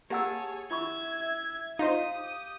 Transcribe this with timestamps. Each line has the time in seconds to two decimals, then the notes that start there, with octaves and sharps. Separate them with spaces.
0.10 A#3 G4 G#4 C#5 F#5 A5 E6
0.71 E4 E5 B5 C#6 G#6
1.22 E5
1.79 D#4 F4 C5 D#5 F5 D#6
2.13 G4